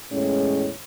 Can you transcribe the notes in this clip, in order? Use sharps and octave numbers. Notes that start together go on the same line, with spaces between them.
E2 A2 G#3 C#4 C#5